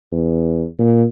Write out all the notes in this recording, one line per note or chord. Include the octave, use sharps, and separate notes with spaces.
E2
A#2